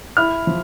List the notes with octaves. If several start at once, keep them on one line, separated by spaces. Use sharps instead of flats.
E4 F6
F3